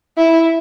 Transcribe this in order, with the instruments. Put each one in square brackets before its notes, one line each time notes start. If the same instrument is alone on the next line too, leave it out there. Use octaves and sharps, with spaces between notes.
[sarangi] E4